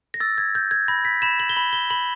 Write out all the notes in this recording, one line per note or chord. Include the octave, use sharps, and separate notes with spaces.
A#6
E6 A6
G#6
G6
G#6
B5 A#6
B6
B5 E7
F#7
G7
B5 F#7
G7
B5 F#7